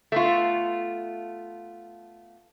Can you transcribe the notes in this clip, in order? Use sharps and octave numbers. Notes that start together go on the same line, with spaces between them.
A3 B3 F4